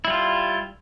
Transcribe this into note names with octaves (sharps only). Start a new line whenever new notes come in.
G3 E4 F4